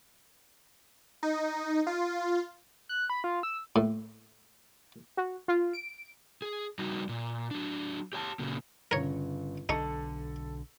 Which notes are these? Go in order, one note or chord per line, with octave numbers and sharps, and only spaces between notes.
D#4
F4
F#6
B5
F4
E6
A2
F#4
F4
D7
G#4
G3 D#4 F#4
A#2
F#3 D4
G4 C#5 G#5 A5
A#2 C#3 A#3
G1 C#3 A#4 C#5
B1 D3 D#4 A4 C#6